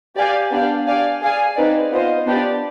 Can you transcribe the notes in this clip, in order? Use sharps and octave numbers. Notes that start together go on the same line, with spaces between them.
G4 D5 F5 G#5
B3 D4 G4 D5 F5
G4 D5 F5 G#5
G#4 D5 F5 G#5
C4 D#4 B4 D5
B3 F4 C5 D#5
B3 D4 G4 D5